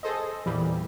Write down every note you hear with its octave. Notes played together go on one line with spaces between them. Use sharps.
G#4 A4 C5 D#5
E2 A#2 E3 G3